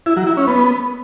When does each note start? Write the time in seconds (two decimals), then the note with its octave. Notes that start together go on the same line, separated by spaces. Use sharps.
0.06 E4
0.16 F#3
0.27 E4
0.37 C#4
0.47 B3